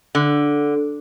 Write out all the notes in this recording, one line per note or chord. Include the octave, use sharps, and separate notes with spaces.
D3